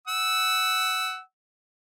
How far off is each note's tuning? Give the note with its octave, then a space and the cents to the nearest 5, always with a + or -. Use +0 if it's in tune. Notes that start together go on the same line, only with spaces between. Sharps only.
F#5 +10 E6 -10